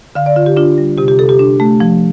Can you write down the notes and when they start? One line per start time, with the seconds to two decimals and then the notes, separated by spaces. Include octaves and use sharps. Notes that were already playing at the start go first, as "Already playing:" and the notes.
0.15 D3 F5
0.26 D5
0.36 D3 F4
0.46 G4
0.57 D4 F4
0.78 G3
0.98 C3 G4
1.08 G4
1.19 C3 A4
1.29 G4
1.39 D4
1.60 A3
1.80 F3